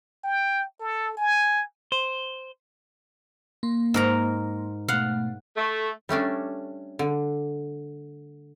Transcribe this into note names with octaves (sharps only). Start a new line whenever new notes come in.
G5
A4
G#5
C5
A#3 C6
G#2 A#4 A#5
B2 A3 F5 F#5
A3
G3 A3 C#4 D4
D3